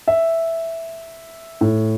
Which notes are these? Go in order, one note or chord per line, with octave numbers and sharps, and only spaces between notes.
E5
A2